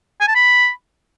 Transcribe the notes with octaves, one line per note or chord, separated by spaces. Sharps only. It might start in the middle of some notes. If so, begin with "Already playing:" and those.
G#5
A5
B5